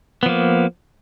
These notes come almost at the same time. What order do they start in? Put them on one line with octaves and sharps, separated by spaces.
B3 F3 A#3